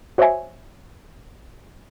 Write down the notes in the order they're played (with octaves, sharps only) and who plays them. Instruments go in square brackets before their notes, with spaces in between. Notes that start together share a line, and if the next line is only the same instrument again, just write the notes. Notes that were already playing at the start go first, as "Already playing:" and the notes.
[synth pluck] F#4 C5 C#5 D#5 E5 G#5